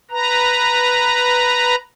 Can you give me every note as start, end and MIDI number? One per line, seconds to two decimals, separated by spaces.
0.11 1.75 71
0.11 1.75 82